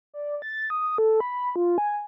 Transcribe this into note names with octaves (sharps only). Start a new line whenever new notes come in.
D5
A6
D#6
A4
B5
F4
G#5